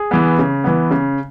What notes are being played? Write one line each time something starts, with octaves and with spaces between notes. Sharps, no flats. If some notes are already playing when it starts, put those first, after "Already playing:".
Already playing: G#4
E3 B3
C#3
E3 B3
C#3